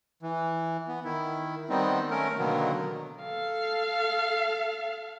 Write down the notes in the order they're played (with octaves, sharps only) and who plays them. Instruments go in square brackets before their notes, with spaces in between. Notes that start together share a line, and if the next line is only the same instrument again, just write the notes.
[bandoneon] E3
B3
D#3 E4
D#3 G3 B3 C4 D#4
A3 C#4 A#4
B2 D3 D#3 F#3 A#3 B3
[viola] A4 F5